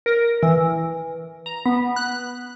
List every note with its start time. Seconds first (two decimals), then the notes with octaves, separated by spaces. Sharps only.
0.06 A#4
0.43 E3
1.46 A#5
1.66 B3
1.96 F#6